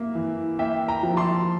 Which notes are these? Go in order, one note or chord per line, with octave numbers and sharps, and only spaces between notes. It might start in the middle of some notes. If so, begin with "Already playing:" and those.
Already playing: A#3 E5
E3
A#3 E5 G5
G5 A#5
F3
A5 C6